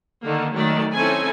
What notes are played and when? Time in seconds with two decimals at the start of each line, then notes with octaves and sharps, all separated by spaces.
0.24 D3 D#3 A#3
0.54 D#3 F#3 A3 A4 D5
0.94 C4 C#4 D#4 E4 A4 G#5